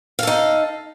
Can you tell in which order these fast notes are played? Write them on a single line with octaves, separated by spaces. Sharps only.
F5 A4 D#4